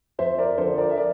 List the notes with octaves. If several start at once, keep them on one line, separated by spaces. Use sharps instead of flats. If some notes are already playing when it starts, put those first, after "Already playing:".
F2 C5 E5
A#4 D5
D3 F3 A4 C5
A#4 D5
E5
A#4 D5